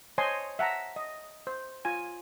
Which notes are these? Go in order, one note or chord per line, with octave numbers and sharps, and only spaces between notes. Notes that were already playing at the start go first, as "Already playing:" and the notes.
C5 C#5 D#5 G#5 A5 C6
E5 F#5 A5 A#5
D#5
C5
F4 G#5